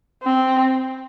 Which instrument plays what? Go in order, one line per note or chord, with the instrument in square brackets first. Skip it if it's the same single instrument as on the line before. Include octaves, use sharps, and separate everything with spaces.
[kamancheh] C4